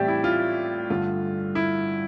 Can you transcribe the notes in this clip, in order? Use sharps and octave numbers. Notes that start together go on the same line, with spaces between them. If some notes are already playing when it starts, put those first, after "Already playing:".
Already playing: A2 E3 G3 C4 G4 D5 E5
E4
F4
G2 D3 A3 F4
E4